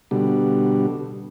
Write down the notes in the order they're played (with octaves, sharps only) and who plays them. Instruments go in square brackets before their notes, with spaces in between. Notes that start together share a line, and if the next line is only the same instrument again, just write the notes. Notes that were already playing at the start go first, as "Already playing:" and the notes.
[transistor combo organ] B2 D3 G3